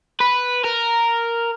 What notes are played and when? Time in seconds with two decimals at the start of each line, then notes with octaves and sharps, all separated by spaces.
0.21 B4
0.64 A#4